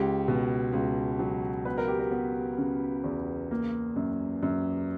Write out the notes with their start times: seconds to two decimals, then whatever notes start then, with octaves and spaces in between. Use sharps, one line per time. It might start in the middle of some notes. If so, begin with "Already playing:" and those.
Already playing: C#2 G4
0.28 B2
0.73 C#2
1.19 F#3
1.65 B3 B4
1.78 A#4
1.88 G4
2.00 A#4
2.11 B3
2.58 C#3
3.04 E2
3.51 A#3
3.96 F#2
4.43 F#2